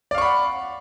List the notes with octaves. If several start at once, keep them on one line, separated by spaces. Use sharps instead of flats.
D5 F5 F#5 B5 C#6